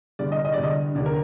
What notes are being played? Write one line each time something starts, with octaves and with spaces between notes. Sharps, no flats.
G2 D3 D5
D#5
D#5
G2 D3 D5
D#5
D#2 D3 D5
A#4